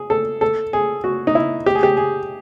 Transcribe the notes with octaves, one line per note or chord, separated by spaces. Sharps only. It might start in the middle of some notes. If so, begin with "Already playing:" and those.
Already playing: G#4
A4
A4
G#4
F#4
D#4
E4
G4
G#4
G4
G#4